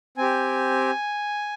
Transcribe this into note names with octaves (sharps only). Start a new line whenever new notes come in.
C4 G4 G#5